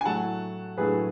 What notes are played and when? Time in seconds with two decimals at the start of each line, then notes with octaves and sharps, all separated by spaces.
0.01 G#5
0.05 A2 F#3 A3 F#5 A5
0.78 A2 F#3 A3 G#4 B4